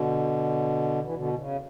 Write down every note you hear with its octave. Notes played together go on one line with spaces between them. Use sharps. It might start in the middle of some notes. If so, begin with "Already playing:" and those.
Already playing: B2 D3
E3
B2 D3
D3
C#3